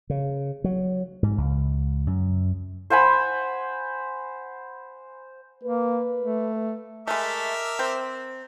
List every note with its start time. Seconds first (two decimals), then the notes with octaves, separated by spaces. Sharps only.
0.10 C#3
0.64 F#3
1.23 G#2
1.38 C#2
2.07 F#2
2.90 C5 F#5 G#5 B5
5.64 A#3 B4
6.19 A3
7.08 G#3 A3 A#4 E5 D6
7.79 C4